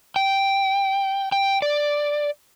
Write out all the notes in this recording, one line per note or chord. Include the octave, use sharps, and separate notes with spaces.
G5
G5
D5